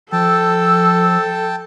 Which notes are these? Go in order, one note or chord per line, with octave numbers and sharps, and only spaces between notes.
F3 A4 G5 A5 E6